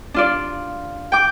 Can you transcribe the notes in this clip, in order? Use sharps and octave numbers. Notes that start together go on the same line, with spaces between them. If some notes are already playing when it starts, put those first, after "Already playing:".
D4 F4 D5
G5 D6